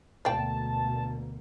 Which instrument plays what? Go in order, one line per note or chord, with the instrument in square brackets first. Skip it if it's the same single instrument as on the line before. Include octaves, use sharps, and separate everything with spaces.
[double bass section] D2 B2 A#3 [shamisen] D5 F5 G5 [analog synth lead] A5